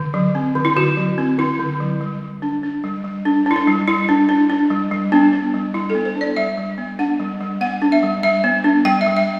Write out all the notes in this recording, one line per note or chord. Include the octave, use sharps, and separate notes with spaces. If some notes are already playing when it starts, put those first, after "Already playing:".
Already playing: D3
F#3
C4
D3
E4
D3 F#4
F#3
C4
D3 E4
D3
F#3
G3
G3
D4
D4
G3
G3
D4
D4
E4
D4
G3
G3 E4
D4
D4
D4
G3
G3
B3 D4
D4
G3
G3 E4
A4
B3
C5
D4
D5
G3 E5
G3
B3
D4 F#5
G3
G3
B3 F#5
D4
E5
G3
G3 E5
B3
D4
G3 G5
E5
G3
E5